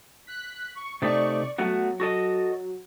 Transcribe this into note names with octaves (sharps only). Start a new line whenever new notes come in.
F#6 B6
C#6
C3 A3 D#4 D5 C#6
F#3 A3 B3 F#4
F#4 A4 D#5